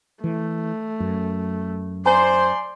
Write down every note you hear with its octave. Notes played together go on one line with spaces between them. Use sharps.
E3 A3
F#2
C5 D5 G#5 A#5 C6